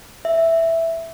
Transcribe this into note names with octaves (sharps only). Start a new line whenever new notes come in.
E5